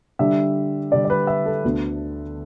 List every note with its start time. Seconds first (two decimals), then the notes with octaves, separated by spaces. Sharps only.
0.19 D3 G3 D4 E5
0.91 D3 G3 D4 D5
1.05 D5
1.10 B4
1.27 E5
1.46 A4
1.64 D2 D3 B3